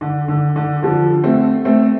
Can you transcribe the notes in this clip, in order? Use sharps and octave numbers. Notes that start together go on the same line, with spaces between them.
D3
D3
D3
D3 F3
A3 C4
A3 C4